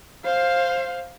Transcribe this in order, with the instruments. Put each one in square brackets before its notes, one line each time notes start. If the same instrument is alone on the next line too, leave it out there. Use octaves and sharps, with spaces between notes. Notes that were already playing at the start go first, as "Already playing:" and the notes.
[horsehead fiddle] C5 F5